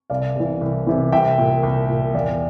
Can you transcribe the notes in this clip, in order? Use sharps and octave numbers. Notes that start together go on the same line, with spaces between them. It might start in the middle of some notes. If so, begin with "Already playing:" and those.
C2 D5 F5
C3 E3
C2
C3 E3
C2 E5 G5
A#2
C2
A#2
E2 D5 F5